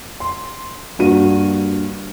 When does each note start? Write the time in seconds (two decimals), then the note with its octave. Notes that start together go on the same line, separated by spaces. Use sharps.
0.20 C6
0.99 G2 A#3 F#4 D#7